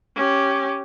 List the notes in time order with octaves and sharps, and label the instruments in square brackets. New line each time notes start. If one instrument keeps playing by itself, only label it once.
[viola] C#4 G4